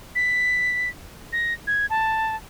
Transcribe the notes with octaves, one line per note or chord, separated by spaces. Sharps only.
B6
A#6
G#6
A5